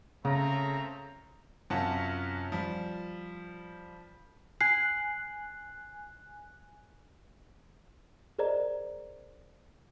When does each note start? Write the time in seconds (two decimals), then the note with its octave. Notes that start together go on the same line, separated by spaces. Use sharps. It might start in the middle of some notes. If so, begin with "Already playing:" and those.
0.25 C#3 A3 C4 A#5
1.70 F#2 C3 C#4 F4 F#5 A5
2.52 F3 G3
4.61 G#5 F#6 C7
8.39 G#4 A#4 C5 D5 D#5 A#5